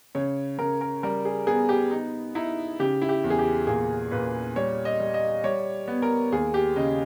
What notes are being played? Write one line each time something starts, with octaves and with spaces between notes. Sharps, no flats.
C#3 C#5
C#3 A#4
A#4
G3 A#4
G#4
B3 G#4
G4
D#4
D#4 E4
C#3 G4
E4
G4
E2
G#4
G4
A#2 G#4
A#2 B4
G3 C#5
D#5
G3
D#5
G3 C#5
B3
A#4
D#2 G#4
G4
C#3 D#5